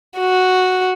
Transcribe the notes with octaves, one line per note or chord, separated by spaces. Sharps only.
F#4